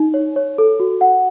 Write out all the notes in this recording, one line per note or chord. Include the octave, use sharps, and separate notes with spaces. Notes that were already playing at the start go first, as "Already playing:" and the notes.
Already playing: D#4
C#5
C#5
A4
F#4
F#5